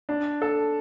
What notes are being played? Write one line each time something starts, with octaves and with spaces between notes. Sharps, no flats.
D4
A4